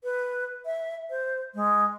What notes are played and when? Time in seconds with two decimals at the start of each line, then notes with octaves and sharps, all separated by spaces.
0.04 B4
0.65 E5
1.10 C5
1.55 G#3